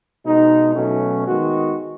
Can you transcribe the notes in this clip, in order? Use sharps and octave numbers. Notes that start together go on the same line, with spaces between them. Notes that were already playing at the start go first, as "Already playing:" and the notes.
B2 G#3 D#4
B2 F#3 A3 C#4
D#3 G#3 B3 F#4